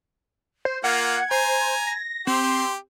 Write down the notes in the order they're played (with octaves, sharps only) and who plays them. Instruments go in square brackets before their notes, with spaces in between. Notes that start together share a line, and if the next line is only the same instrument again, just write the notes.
[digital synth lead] C5
[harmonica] A#3 F4 [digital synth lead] F#5 [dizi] G#6
[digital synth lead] C5 [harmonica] G#5 A#5
[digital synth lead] A#6
[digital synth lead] C4 [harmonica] G4 [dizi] C6